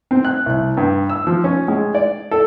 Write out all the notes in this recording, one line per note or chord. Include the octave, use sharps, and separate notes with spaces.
C4
F#6
C2
G2
E6
F3
C#4
G#3
D5
A4